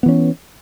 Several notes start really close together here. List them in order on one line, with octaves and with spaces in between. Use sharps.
B3 E3 C#4